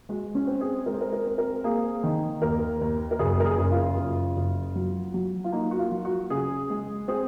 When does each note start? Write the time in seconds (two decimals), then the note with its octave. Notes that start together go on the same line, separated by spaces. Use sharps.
0.09 G#3 F#4
0.35 C#4
0.47 C4
0.61 G#4
0.86 G#3 A#4
0.94 C5
1.01 A#4
1.13 A#4
1.26 C4
1.38 A#4
1.64 A#3 G#4
2.04 D#3
2.42 D#2 A#4
2.81 D#2
3.11 A#4
3.19 F#1 G#4
3.40 A#4
3.45 G#4
3.59 F#1
3.71 F4
3.97 F#1
4.37 F#1
4.75 F#3
5.14 F#3
5.44 F4
5.52 A#3 D#4
5.71 F#4
5.79 F4
5.92 F#3
6.05 F#4
6.30 C#3 G#4
6.70 G#3
7.08 C4 G#4